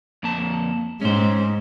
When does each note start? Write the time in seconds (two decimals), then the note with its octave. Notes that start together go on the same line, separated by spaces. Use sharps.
0.23 F2 A#3 A5
1.01 G#2 C#4 C5